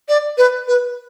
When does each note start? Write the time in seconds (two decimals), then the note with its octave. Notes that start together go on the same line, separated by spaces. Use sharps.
0.09 D5
0.38 B4
0.68 B4